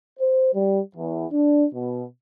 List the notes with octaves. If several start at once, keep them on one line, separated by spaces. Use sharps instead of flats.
C5
G3
E2
D4
B2